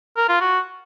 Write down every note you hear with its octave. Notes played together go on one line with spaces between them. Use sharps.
A#4
F4
F#4